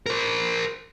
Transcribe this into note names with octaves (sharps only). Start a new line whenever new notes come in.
A#4 C5